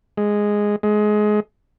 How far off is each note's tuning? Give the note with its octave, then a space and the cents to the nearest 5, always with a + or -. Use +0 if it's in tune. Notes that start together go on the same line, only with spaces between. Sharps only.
G#3 -5
G#3 +20